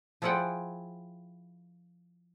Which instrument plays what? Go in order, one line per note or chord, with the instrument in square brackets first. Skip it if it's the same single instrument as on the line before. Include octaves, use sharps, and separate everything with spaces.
[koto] F3 E4 F4 G#4 F#5 G5